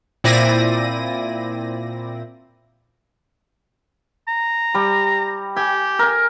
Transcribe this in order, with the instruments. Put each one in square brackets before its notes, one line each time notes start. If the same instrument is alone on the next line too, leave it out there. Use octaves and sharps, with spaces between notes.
[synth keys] A#2 C4 E4 D5 A#6 D#7
[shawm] A#5
[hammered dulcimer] G3
[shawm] G4 [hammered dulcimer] G#5
[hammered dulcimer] A#4 G#5